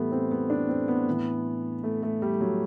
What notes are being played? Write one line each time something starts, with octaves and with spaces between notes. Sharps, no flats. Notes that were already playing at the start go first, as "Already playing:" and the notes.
Already playing: A2 E3 G3 A3 B3
C4
B3
D4
C4
B3
A2 E3
A3
A3
G3
F#3